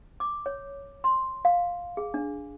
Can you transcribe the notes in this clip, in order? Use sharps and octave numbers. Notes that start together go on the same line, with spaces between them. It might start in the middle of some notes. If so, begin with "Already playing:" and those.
D6
C#5
C6
F5
G#4
D4